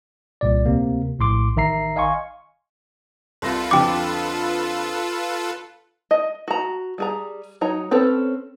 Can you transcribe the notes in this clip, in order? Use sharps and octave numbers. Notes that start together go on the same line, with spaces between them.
C2 A#2 D5
D2 C3 A#3
A#1 A2 C6 D6
A1 D#3 E5 A#5 C7
D#5 F5 G#5 C6 C#6
C2 F4 A4 B4 C6 A#6
F2 D3 F3 G5 D6
D#5
F#4 A#5
G3 G#4 A#5
F#3 D#4 C#5 A#5
C4 C#4 A4 B4